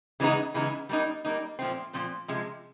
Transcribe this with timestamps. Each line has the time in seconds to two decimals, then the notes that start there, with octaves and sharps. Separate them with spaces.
0.20 C#3 E3 G#3 B3 D#4
0.54 C#3 E3 G#3 B3 D#4
0.89 G3 A#3 D#4
1.25 G3 A#3 D#4
1.59 A#2 F3 A3 C4
1.93 A#2 F3 A3 C4
2.28 C3 F3 G#3